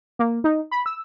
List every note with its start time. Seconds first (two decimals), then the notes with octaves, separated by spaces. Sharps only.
0.19 A#3
0.44 D#4
0.71 B5
0.86 E6